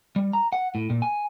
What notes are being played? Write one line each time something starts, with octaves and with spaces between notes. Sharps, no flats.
G3
A#5
F#5
A2
A#2
G#5